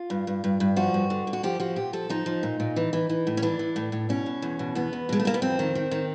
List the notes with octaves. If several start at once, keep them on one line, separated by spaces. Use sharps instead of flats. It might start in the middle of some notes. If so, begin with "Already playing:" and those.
Already playing: F4
G2
G2
G2
G2
F3 F#4
G2
D3
D3
F#4
F3 G4
F3 F#4
A#2 G4
F3 A4
F3 D#4
F3
A#2
A#2
E3
E3
E3
A2
C#4
E3 D4
E3
A2
A2
B2 C#4
B2
E2
B2
E2 B3
E2
B2 G#3
A3
B2 A#3
B3
F2 C4
D#3
D#3
D#3